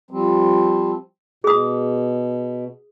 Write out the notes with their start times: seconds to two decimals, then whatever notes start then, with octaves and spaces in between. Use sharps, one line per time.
0.11 F3 G3 C4
1.44 B2 G#4 D#6